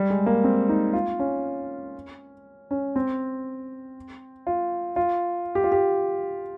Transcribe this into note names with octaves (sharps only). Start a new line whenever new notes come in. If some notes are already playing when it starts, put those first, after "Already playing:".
Already playing: G3
G#3
A#3
C4
D#4
F4
C#4
C#4
C4
F4
F4
G4
F4
G4